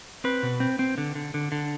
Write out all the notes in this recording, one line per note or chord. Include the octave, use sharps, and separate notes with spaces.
C4 B4
B2
C4
C4
D3
D3
D3
D3